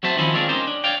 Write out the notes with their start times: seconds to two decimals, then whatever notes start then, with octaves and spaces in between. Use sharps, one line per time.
0.03 F#3 C4 F#4 C5 E5 A5
0.17 D#3 F3 C4 C#4 E4 F4
0.34 D#3 G#3 C4 D4 F4 C#5
0.49 C#4 D#4 G4 A#4 C5
0.67 D4
0.84 C#5 D5 F5 G5